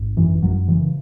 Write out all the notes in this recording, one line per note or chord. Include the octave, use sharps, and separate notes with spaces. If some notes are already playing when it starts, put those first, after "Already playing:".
Already playing: G#1
F#2 E3
F#2 F#3
C#3 E3